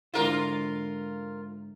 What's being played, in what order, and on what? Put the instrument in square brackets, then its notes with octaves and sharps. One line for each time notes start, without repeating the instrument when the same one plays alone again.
[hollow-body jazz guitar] G#2 D3 E4 [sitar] F4 A#4